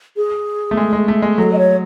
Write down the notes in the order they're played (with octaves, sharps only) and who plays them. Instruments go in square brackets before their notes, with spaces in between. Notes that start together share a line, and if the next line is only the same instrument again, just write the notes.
[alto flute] G#4
[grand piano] A3
G#3
G#3
A3
G#3
[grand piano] F#3 [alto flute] A4
[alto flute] D#5
C#5